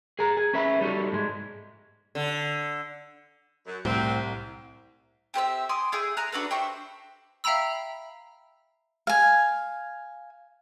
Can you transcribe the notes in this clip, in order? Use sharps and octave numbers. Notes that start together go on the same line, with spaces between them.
G#4 A#5
G#4
C#4 B4 E5 B5
G3 D#4 F#4 A4
G#2 G#3
D3
F#2
C2 A2 C4
C4 G4 C5 E5
G#5 C6 D6 D#6
E4 G#4 G6
G#5 A#5 F#6
D4 F#4 A4 B4
G4 C5 E5 C#6
E5 F5 G5 A#5 B5 E6
F5 G#5